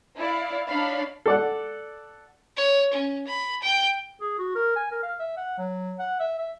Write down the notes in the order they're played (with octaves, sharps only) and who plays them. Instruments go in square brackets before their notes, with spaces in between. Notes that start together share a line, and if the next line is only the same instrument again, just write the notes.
[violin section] E4 D5 F5
D4 D#4 C#5 D5 F5 B5
[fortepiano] A4 D5 F#5
[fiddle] C#5
C#4
B5
G5
[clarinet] G#4
F#4
A#4
G#5
A#4
F5
E5
F#5
F#3
F#5
E5
E5